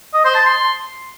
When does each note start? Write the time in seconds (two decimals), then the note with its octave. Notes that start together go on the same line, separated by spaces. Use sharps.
0.14 D#5
0.25 C5
0.35 A5
0.46 C6